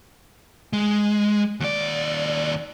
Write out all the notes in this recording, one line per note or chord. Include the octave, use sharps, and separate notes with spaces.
G#3
D#2 D5